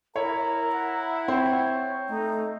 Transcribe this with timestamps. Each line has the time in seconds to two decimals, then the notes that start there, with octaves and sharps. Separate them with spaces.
0.16 E4 A#4 C#5 A#5
0.72 F#5
1.28 C4 C#5
2.09 A3 D#4